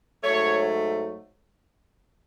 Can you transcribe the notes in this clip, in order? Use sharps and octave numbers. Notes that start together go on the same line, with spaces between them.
G#2 F#3 A3 C#5